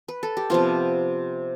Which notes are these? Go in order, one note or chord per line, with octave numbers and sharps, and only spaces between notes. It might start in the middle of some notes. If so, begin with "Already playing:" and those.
B4
A4
G4
C3 F3 B3 F4